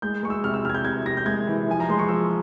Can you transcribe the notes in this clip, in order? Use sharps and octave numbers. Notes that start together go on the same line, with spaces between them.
G#3 G6
G#3 C#6
E6
C3 F6
E6
C3 F6 G#6
G6
C3 G#6
C3 A#6
G6
G#3 G#6
E3
F3 G#5
A#5
G#3 C6
C#6
F3 E6